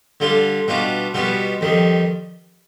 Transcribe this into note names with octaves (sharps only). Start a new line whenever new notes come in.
D3 G3 D4 F4
B2 G3 D4 F4
B2 G3 B3 F4
F2 D#3 G3